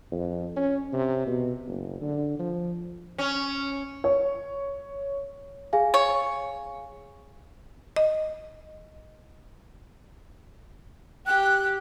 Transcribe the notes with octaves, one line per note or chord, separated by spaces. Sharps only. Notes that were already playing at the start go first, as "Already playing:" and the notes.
F2
C#4
C3
B2
F#1
D3
F3
C#4
C#5
G#4 F5 G#5
C#5
D#5
G4 F#6